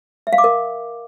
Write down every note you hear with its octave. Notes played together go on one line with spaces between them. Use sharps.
E5
F5
D6
A#4